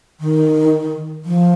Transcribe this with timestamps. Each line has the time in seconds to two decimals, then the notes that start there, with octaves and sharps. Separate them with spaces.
0.20 D#3
1.25 F3